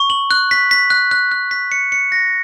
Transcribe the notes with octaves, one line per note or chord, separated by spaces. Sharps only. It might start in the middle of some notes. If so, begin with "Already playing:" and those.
Already playing: C#6
F#7
F#6
B6
B6
F#6
F#6
F#6
B6
C#7
C#7
A#6